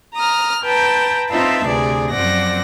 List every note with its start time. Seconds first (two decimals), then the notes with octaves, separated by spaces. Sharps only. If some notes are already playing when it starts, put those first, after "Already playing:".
0.15 A#5 D#6 F6
0.64 B4 G5 A5 A#5
1.30 C4 D#4 F4 B4 E5 A5
1.65 D2 C3 G#4 D5
2.11 F#2 F3 C4 D5 F#5 A#6